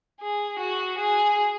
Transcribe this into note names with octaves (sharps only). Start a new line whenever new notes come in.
G#4
F#4
G#4